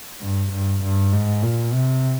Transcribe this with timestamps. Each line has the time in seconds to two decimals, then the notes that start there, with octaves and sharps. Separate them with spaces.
0.21 G2
0.51 G2
0.82 G2
1.12 G#2
1.43 A#2
1.73 C3